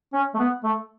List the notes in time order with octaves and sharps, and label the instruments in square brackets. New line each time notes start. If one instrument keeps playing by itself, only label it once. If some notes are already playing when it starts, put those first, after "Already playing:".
[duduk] C#4
A3
B3
A3